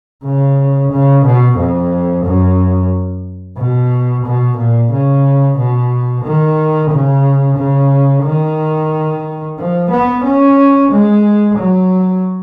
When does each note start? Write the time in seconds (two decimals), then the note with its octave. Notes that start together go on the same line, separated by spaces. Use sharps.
0.24 C#3
0.92 C#3
1.25 B2
1.58 F2
2.25 F#2
3.57 B2
4.25 B2
4.57 A#2
4.92 C#3
5.58 B2
6.24 D#3
6.91 C#3
7.57 C#3
8.24 D#3
9.58 F3
9.91 B3
10.24 C#4
10.92 G#3
11.58 F#3